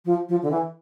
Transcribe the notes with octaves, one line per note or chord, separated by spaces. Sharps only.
F3
F3
D3
E3